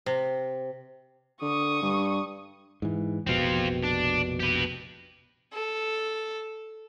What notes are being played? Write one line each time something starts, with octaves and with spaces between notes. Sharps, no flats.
C3
D3 C#6 D#6
G2
G#2 E3
F1 A#1 B2 C4 F4
D4
G4 B4
A4